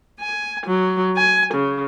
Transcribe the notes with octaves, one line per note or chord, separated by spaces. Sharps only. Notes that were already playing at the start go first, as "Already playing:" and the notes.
G#5
F#3
G#5
C#3